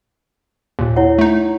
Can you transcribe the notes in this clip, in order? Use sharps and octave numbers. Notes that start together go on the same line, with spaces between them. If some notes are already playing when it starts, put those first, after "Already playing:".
D#2 A#2
E4 C#5 F#5
A3 D#4